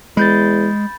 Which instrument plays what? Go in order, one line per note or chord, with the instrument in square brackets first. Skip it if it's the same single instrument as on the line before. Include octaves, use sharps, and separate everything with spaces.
[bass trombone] E2 [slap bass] G#3 [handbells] B5 G6 A6